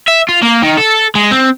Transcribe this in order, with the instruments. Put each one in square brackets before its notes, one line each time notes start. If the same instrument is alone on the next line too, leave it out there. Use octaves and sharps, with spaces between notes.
[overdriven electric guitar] E5
F4
A#3
D#3
A4
G#3
C4